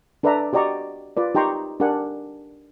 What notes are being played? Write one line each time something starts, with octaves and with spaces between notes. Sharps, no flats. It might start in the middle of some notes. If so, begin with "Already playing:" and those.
D4 A4 B4 D5 E5 A#5
F#4 G4 D5 D#5 A#5 C#6
F4 B4 D5
D#4 G4 G5 A#5 C6 C#6
D4 G4 A#4 F#5 G#5